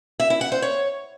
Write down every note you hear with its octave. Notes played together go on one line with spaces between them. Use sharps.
E5
E4
F#5
C5
C#5